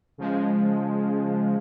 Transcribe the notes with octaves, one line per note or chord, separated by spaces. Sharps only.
C#3 F3 G#3